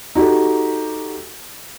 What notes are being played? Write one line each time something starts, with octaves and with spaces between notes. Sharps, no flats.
D#4 F#4 G4 A4